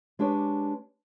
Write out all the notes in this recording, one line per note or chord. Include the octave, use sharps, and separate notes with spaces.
G#3 D4 G4 B4 C#5